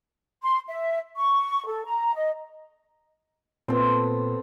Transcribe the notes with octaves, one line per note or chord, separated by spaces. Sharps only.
C6
E5
C#6
A4
A#5
D#5
A#2 B3 C4 A4 C5